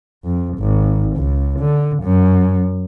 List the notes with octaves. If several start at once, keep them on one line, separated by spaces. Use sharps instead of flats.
F2
G#1
C#2
D3
F#2